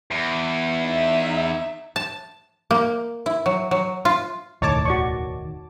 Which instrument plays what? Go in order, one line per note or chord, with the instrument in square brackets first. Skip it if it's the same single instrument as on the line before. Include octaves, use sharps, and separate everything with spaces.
[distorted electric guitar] E2
[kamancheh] D#4 E5
[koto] A5
A#3
E4
F#3
F#3
F4
[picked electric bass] E1 D2 A2 [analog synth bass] D#3 [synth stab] C#5 A5 D6
[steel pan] F#4 D5 C#6